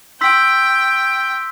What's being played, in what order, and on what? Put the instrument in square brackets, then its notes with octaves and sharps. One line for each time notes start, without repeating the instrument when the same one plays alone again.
[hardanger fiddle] G5 [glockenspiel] C6 E6 B6